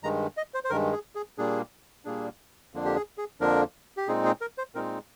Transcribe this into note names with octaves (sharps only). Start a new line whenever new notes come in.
G2 D#3 G#3 A#5
D#5
C5
C5
G2 D#3 G#3 A#4
G#4
G#4
A#2 G3 A#3 D4 G#4
A#2 G3 A#3 D4 G#4
F2 D3 F3 A#3 D4
G4
G#4
G#4
F2 D3 F3 A#3 D4 A#4
G4
A#2 G#3 C4 D#4 G#4
G#4
A#4
C5
A#2 G#3 C4 D#4 A#4